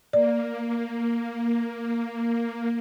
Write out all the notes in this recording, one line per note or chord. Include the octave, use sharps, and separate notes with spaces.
A#3 D5